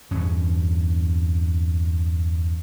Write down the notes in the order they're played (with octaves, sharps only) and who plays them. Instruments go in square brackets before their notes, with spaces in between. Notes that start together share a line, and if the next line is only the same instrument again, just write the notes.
[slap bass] E2 G2 C#4